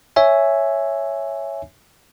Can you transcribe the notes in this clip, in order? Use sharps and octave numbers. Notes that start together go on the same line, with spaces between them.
C#5 E5 G#5